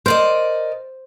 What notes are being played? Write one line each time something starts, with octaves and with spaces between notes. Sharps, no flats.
A#4 C5 D5 D#5